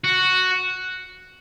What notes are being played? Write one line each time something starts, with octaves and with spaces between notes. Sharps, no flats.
F#4